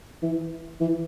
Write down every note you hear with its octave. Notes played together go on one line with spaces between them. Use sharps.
E3
E3